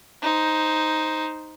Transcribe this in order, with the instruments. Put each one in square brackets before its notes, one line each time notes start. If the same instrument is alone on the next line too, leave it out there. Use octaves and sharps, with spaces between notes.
[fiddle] D#4 C5